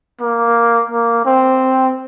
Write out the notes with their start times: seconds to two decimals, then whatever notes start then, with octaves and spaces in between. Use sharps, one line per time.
0.21 A#3
0.90 A#3
1.25 C4